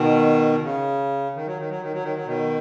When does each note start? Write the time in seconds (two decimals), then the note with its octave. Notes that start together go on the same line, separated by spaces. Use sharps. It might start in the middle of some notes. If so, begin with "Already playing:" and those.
Already playing: B2 D#3
0.63 C#3
1.35 D#3
1.46 F#3
1.58 D#3
1.69 F#3
1.81 D#3
1.92 F#3
2.03 D#3
2.15 F#3
2.26 B2 D#3